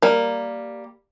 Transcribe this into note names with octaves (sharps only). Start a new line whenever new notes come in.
G3 A#3